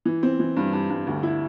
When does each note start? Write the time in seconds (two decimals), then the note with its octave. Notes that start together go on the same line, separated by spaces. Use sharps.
0.05 E3
0.23 C4
0.40 E3
0.57 G2
0.73 G2
0.90 G2
1.07 D2
1.23 E4